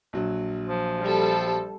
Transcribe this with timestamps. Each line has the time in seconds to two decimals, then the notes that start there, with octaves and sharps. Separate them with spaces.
0.13 A#1 F#3
0.68 F3
1.01 G3 A4